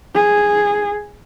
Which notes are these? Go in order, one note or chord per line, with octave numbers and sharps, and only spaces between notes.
G#4